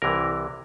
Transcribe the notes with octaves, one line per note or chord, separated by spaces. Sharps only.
C2 C3 E3 A#4